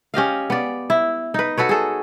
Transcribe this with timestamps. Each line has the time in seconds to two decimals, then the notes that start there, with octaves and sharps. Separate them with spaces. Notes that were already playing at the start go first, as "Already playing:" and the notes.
0.14 C#4 G4 D#5 F5
0.50 B3 D5
0.90 E4
1.34 D#4 B4
1.57 F#4 A4 B4 C#5
1.69 G#4 A4